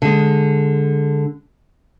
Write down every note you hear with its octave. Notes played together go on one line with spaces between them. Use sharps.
D3 G#3